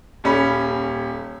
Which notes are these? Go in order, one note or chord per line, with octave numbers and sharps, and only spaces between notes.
D#1 C#4 B5